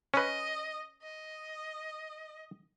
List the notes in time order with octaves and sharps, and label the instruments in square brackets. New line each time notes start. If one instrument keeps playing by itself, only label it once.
[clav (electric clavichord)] C#4 B4 [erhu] D#5
[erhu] D#5